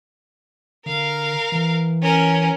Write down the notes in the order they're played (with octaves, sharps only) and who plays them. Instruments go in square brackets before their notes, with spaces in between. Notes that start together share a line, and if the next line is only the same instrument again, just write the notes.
[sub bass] D3 [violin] A#4 F5
[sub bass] E3
[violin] C#4 A#4